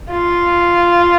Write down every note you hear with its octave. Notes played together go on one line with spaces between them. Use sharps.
F4